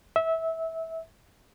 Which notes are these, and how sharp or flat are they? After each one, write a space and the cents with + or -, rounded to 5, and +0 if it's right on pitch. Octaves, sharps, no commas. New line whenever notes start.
E5 -20